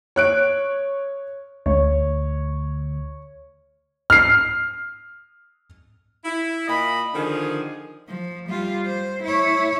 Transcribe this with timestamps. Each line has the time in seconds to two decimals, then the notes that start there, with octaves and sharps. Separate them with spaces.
0.16 C#5 F#6 D7
1.66 D2 C#5
4.10 F6 C7
6.24 E4
6.68 A#2 D#5 B5
7.13 D3 D#3 F3 D#4 G#4
8.08 F3
8.49 G3 F4
8.86 C5
9.24 E4 C#5